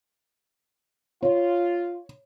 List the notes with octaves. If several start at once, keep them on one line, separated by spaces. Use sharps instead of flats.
F4 C#5